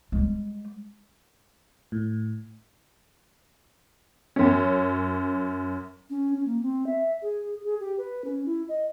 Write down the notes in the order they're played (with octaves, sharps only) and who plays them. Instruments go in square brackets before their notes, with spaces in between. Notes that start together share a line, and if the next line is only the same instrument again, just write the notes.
[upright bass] G3 G#3
[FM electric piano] A2
[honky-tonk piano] F#2 C#4
[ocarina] C#4
C#4
A#3
C4
E5
G#4
G#4
G4
B4
C#4
E4
D#5